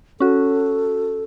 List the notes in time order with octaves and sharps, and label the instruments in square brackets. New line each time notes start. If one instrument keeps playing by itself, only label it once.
[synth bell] C#4 F#4 [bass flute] A4